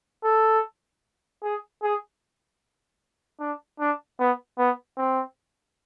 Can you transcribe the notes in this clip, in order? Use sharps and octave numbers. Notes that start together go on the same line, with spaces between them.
A4
G#4
G#4
D4
D4
B3
B3
C4